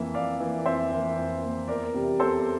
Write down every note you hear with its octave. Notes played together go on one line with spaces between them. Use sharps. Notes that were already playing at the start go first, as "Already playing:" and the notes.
Already playing: F2 E3 A#3 E5
F2 D5 F5
E3 A#3
F2 C5 E5
E3 A#3
F2
E3 A#3
E2 A#4 D5
C3 E3 G3
E2 A4 C5